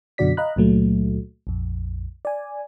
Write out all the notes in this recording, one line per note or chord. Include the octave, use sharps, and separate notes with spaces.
F#2 B2 D3 F#4 D5 B6
D#5 F5 A#5 B5 F#6
C#2 A#2 F#3 A3
A#1 F2
D5 G#5